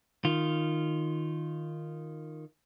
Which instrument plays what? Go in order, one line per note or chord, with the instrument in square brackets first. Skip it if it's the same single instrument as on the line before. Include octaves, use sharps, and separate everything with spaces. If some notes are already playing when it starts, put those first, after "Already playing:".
[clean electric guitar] D#3 F4